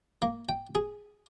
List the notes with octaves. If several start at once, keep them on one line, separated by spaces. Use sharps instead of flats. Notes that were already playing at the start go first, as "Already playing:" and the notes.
A#3
G5
G#4